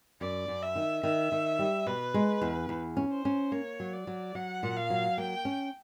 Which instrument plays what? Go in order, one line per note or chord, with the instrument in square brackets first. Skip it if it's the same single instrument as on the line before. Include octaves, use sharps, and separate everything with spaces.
[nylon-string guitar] F#2 [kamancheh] D5
[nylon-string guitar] F#2
[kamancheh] E5
[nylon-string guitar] D#3
[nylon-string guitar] D#3 [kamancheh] E5
[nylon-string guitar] D#3
G3
[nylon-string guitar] B2 [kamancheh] B4
[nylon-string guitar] G#3
E2
E2
C#4
[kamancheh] C5
[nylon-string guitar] C#4
[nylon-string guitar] A#3 [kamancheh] C#5
[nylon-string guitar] F#3
[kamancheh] D5
[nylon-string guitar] F#3
[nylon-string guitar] F#3 [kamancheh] F#5
[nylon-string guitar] A#2
[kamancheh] F5
[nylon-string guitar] F#3
[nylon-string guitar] A#3 [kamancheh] G5
[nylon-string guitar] C#4